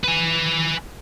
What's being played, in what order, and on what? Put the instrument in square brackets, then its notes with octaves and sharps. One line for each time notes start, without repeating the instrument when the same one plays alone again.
[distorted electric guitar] B4 G#5